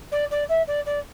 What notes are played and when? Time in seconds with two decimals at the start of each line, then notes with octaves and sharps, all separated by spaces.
0.11 D5
0.30 D5
0.49 E5
0.67 D5
0.86 D5